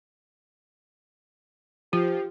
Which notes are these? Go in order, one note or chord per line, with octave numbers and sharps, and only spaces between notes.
F3 F4 G4